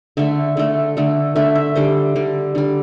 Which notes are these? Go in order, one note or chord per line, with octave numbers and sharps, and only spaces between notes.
D3 A3 E5
D3 A3
D3 A3
D3 A3 E5
E5
D3 G3 C5
D3 G3
D3 G3